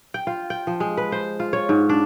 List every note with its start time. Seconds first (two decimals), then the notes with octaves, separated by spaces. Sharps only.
0.14 G5
0.27 F4
0.50 G5
0.67 F3
0.80 G#3
0.97 B4
1.12 C5
1.40 F4
1.53 C#5
1.69 G#2
1.89 D4